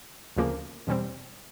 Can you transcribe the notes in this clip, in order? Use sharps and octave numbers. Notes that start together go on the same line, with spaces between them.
D2 C#3 F3 A#3
E2 B2 G3 C4